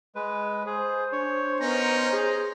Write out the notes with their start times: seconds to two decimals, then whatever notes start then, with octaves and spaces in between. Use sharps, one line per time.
0.15 G#3 B4
0.66 G#4 C5
1.12 D4 C#5
1.60 B3 C#4 D#4 A#4 A#5
2.13 G#4